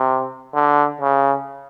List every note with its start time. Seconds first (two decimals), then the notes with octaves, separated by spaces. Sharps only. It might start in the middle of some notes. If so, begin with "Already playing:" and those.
Already playing: C3
0.54 D3
1.01 C#3